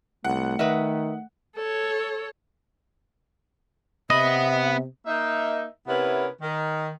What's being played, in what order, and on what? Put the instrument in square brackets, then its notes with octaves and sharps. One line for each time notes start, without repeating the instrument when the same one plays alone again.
[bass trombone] C2 [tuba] A3 [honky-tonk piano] F#5
[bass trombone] D#3 [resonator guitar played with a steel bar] B4 D#5 E5
[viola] A4 C#5
[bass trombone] C3 [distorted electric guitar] B3 B5 [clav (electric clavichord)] D#5 [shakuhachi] E5
[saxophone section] A#3 D#4 E5
C3 B3 C#4 E4 A#4 B4
D#3